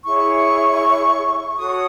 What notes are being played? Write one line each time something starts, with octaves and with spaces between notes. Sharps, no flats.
E4 G#4 C#5 C#6
F#4 A4 C#5 D#6